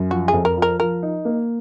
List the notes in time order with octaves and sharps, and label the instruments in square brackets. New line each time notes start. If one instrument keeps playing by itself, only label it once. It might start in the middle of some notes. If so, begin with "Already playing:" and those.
Already playing: [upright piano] F#2
[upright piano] F3 [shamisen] F#4
[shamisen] G#4
[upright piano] F2
[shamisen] A#4
[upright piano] F3
[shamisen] A#4
[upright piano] F3 [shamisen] A#4
[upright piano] D#4
A#3